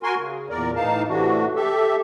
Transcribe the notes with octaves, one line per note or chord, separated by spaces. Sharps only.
F#4 A#4 G#5 C6
C#3
E2 A#2 A#4 D5
A2 E3 D#4 F5 A5
A2 C3 E3 A3 D4 F#4
G4 A4 E5